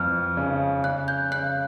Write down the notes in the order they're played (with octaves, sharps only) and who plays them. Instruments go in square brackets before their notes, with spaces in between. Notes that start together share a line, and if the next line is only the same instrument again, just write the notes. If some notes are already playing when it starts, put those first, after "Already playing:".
Already playing: [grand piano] F2 E3 [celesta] F6
[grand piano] C#3
[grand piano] C#3 [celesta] F#6
[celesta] G6
[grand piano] C#3 [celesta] F#6